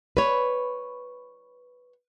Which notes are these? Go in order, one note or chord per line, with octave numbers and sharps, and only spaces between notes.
B4 C#5